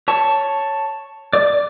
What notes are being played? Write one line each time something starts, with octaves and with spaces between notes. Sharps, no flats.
C#5 A5 C#6
D5 D6